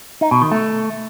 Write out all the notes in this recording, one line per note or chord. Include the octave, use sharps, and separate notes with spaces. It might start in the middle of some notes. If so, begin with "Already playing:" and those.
D#4
B2
D#3
A3